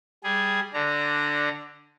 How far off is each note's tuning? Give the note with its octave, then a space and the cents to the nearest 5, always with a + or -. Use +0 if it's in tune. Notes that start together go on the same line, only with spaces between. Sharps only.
G3 +0 G#4 +0
D3 +5 D4 +0 A#5 -20